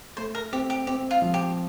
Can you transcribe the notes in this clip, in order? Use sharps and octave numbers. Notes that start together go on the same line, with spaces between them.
A3 C5
A#4
C4 G4
G4
C4 G4
F4
F3
G4